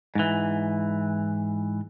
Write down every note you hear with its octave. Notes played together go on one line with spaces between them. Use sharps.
G#2 E3